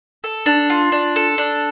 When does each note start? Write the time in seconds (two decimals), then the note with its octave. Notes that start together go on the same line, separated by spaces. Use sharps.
0.24 A4
0.46 D4
0.70 F4
0.92 D4
1.16 A4
1.38 D4